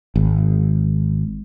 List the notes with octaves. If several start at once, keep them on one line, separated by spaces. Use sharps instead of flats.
G#1